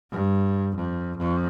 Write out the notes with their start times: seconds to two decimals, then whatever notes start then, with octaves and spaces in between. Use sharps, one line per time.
0.11 G2
0.75 F2
1.17 F2